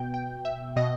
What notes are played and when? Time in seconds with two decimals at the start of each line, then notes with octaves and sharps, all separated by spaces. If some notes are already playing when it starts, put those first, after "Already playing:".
Already playing: B2 G5
0.14 G5
0.45 E5
0.76 B2 D#5